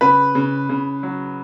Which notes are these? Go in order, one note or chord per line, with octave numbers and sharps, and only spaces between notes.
C#3 B4
C#3
C#3
F#3